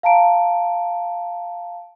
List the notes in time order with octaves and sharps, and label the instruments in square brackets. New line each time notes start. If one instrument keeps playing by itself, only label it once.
[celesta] F5 A5 A#5 D7